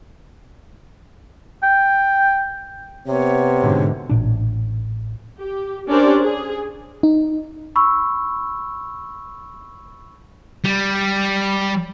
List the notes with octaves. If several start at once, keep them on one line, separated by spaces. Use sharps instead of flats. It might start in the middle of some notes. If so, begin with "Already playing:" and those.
G5
C3 B3 C#5
G#2 B2 D3
A1 A#2 D4
G4
C#4 D4 G4 A#4 C5 D5
G#4
D#4
B5 C#6 E6
G3